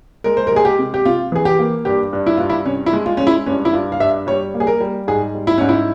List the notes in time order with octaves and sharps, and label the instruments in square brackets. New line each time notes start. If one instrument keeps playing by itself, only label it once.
[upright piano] G#3 A#4
C5
A#4
G#3 G#4
G4
C3
G4
C3 F4
E3 G#4
G4
A#3
G2 G4
G2
E4
G2 F4
E4
C3 C#4
E4
G#3
F4
G#3 C#4
E4
G2 C#4
E4
G2 F4
F5
G2 E5
G3 C#5
A#3
G#4
A#4
G3
G#2 G#4
G3
E4
G#2 C#4
E4